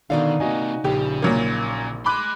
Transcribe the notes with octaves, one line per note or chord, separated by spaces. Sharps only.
B2 D3 D#3 D#4 D5 F5
C3 A#3 F#4 D#5 G#5
A#1 C#3 G4
A#2 F#3 A#3
G#4 B5 C6 D6 F#6